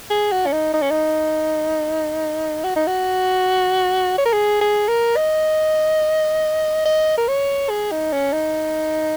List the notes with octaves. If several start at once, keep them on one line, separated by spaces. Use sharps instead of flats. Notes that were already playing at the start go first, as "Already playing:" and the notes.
G#4
F#4
C#4
D#4
D#4
C#4
D#4
F#4
D#4
F#4
C#5
A#4
G#4
G#4
A#4
D#5
D#5
A#4
C#5
G#4
D#4
C#4
D#4